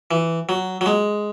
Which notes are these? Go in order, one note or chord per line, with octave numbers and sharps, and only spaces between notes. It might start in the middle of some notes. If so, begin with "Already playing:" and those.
E3
F#3
F#3
G#3